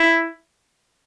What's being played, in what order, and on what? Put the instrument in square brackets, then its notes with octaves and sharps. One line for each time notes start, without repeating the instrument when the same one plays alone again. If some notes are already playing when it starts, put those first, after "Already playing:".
Already playing: [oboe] E4